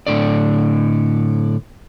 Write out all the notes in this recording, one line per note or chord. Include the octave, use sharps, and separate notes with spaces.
A2 D3 D5